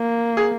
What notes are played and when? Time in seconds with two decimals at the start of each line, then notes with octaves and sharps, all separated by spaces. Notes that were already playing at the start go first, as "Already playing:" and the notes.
Already playing: A#3
0.37 G#4